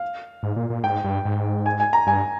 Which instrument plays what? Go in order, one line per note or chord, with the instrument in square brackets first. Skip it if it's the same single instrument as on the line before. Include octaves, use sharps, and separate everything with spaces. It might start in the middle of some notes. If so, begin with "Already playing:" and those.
Already playing: [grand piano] F5
[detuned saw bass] G#2
A#2
A#2
[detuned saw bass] G#2 [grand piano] G5
[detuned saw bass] G2
G#2
[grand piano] G#5
G#5
A#5
[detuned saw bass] G2 [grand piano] G#5